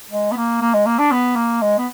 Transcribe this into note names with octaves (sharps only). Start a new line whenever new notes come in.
G#3
B3
A#3
A#3
G#3
A#3
D4
B3
A#3
G#3
B3